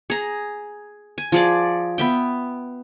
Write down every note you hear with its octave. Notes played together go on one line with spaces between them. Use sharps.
G#4 A#5
G#5
F3 G#4 D5
B3 E5 G5